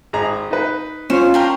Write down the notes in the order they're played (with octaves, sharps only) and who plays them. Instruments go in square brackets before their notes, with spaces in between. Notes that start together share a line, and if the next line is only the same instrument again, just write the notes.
[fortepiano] G#1 G#4 A#5
D#4 B4
[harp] C#4 [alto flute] F4 [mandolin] C5
[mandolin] D4 G4 A#4